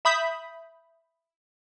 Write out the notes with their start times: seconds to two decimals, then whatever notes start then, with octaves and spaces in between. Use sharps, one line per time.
0.05 E5 B5 D#6 G6 B6